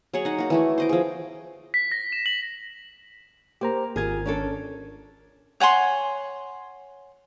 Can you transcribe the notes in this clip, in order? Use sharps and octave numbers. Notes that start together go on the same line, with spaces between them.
F#3 G#4 C#5 F#5
D#4 F#5
A#3 F#4
E3 A3 E4
C5 D#5 D6
F3 G#4
B6
A#6
E7
F#7
A#3 G4 C5 A#5
G#1 F4 G#4 A#4 G#6
C#4 D4 A4
C#5 F#5 G#5 C6